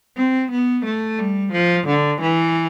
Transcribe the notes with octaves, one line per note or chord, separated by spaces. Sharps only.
C4
B3
A3
G3
F3
D3
E3